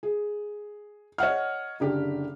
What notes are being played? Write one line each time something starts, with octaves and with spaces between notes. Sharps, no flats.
G#4
C#5 D#5 F#5 F6
F#1 D3 G4